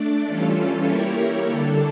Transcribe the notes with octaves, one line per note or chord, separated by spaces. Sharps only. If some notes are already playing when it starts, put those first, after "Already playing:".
Already playing: A3 D4 D5
E3 G3 C#4 F4 A4
A#3 E4 G4 A#4 C#5
D3 G3 D4 A4